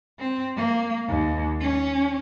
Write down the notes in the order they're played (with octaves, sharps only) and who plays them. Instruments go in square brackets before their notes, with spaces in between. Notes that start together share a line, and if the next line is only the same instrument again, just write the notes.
[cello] C4
A#3
D#2
C#4